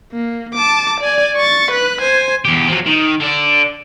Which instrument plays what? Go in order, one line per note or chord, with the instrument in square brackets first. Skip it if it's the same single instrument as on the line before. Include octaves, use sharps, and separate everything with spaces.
[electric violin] A#3
A5 D6
D5 G#5
C#6 A6
B4 F#6
C5 G#5
[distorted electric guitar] E2 G4
F3 F#3
D#3
D3 D5